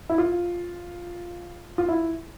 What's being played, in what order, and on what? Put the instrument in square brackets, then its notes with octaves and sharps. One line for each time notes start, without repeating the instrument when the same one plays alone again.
[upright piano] E4
F4
F4
E4